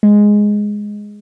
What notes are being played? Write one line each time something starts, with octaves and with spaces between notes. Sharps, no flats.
G#3